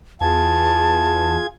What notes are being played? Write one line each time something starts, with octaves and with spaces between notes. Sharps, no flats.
E2 F4 G#4 A5 G#6